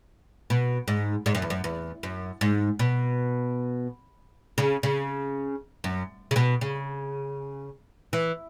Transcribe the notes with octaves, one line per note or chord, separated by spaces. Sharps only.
B2
G#2
G#2
F#2
E2
F#2
E2
F#2
G#2
B2
C#3
C#3
F#2
C#3
B2
C#3
E3